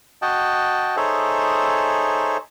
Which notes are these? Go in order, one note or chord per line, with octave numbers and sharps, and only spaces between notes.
F#4 D#5 F#5 G5 A5
D#4 G#4 A4 C5 C#5 E5